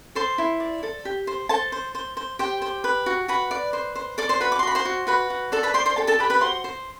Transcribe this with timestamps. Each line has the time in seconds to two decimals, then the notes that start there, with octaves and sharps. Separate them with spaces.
0.15 A4 C5 C6
0.38 E4
0.60 D5
0.83 A4
1.05 G4
1.27 C5
1.49 A4 C5 A5
1.72 C5
1.95 C5
2.17 C5
2.39 G4 C5 G5
2.62 C5
2.84 B4
3.06 F#4
3.28 F#4 B4 B5
3.51 D5
3.73 C5
3.96 C5
4.18 A4 D5 D6
4.29 C5 C6
4.40 F#4 B4 B5
4.52 D6
4.59 C6
4.63 F#4 B5
4.75 C5 C6
4.85 F#4
5.07 F#4 B4 B5
5.30 F#4
5.52 A4 D5 A5
5.63 B4 B5
5.74 C5 D5 C6
5.86 C5 C6
5.96 G4 A4 A5
6.07 A4 A5
6.19 G4 B4 B5
6.30 B4 B5
6.41 F#4 C5 C6
6.64 C5